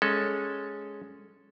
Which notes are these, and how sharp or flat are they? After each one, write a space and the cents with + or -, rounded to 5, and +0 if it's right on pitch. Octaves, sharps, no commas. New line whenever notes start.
G#3 +0 C#4 +0 A4 +0